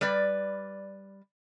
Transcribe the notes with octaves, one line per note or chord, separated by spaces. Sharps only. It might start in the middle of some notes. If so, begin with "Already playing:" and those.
G3 B4 D5